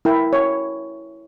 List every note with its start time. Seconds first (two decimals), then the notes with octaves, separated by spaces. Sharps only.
0.05 E4 A#4 G5
0.33 C#5